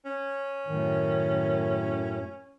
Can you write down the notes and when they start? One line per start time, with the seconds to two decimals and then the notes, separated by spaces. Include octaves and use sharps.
0.05 C#4
0.67 F#2 A2 D#3